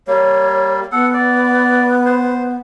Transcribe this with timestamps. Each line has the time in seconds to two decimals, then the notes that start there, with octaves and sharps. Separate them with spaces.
0.07 G3 A#3 C#5
0.92 B3 A4 F#5
1.14 D5
2.05 C5